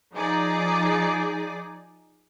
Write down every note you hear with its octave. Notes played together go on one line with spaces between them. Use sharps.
F3 D#4 G#4 D5